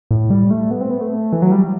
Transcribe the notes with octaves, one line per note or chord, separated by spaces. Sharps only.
A2
G3
A3
B3
C4
B3
A3
E3
F#3
G3